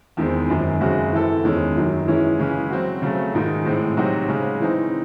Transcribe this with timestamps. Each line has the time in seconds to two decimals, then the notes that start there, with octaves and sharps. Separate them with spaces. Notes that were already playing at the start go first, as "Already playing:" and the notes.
0.17 E2 D#3 G#3 C4
0.49 F#2 D#3 G#3
0.80 F#2 C#3 G#3 C4 F#4
1.12 E3 C4 E4 A4
1.44 E2 D#3 G#3 C#4
1.75 F#2 D#3 F#3
2.07 E3 G#3 C#4 E4
2.39 C#3 E3 G#3 C#4
2.70 F#3 C4 F#4
3.02 C#3 F#3 A3
3.34 G#2 D#3 G#3 D#4
3.65 A2 G#3 C4
3.97 C3 F#3 C4 D#4 F#4
4.29 C#3 G#3 C#4
4.60 E3 C4 D#4